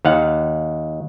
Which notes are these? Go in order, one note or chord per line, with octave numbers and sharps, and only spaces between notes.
D#2 F5 F#5